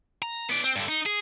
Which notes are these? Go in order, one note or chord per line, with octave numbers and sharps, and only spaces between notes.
A#5
B3 D5
C4
G2 D3
D#4
G#4